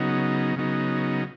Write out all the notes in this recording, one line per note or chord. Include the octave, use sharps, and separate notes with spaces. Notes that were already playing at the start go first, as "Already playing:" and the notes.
Already playing: C#3 F#3 B3 D#4
C#3 F#3 B3 D#4